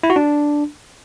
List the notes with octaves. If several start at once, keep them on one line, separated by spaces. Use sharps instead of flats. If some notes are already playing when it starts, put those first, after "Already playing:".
E4
F#4
D4